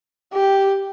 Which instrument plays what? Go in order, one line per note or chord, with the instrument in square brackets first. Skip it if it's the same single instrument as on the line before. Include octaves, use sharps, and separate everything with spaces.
[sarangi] G4